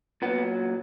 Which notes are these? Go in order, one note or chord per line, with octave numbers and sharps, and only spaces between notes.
A#2 F#3 B3